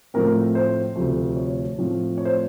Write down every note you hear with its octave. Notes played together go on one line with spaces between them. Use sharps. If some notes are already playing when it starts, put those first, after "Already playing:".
A2 F3 A3 C4 A#4
C5
D2 C3 F3 A3
C#5
A2 F3 A3 C4
C#5
C5